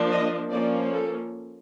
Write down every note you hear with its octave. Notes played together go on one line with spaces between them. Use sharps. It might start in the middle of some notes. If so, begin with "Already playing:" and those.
Already playing: F3 A#3 D4
D#5
F3 A#3 C#4 D5
A4